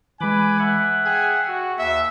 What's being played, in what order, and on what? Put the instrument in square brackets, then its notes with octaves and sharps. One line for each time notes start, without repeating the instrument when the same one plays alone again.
[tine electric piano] E3 G#3 [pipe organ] B4 B5 D6 [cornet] G#5
[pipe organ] E5 F#5
[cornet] G#4 [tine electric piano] G5
[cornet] F#4
[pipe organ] D#2 [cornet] E5